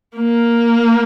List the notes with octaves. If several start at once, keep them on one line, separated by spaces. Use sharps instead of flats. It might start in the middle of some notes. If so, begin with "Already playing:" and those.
A#3